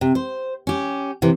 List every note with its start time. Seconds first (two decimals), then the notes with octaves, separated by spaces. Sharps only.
0.01 C3
0.15 C5
0.67 C#4 G4
1.22 C3 E3